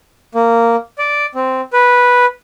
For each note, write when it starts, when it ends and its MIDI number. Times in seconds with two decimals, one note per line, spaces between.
0.35 0.76 58
0.98 1.26 74
1.35 1.61 60
1.73 2.26 71